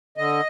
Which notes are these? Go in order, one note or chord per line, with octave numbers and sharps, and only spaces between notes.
D3 D#5